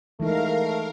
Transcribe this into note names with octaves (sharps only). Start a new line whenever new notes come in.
E3 G#3 A3 D#4 A#4 F5